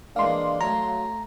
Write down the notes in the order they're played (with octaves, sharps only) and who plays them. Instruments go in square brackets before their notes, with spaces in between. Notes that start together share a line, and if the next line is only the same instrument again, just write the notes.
[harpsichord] E3 G#3 A#3 [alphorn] D4 [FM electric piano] F5 C6
[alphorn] F#3 [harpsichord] A3 C#5 [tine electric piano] A#5